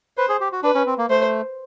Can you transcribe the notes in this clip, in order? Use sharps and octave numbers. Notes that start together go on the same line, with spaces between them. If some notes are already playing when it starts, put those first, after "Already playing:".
B4 C5
G#4
G4
F#4
D4 B4
C#4
C4
A#3
A3 C5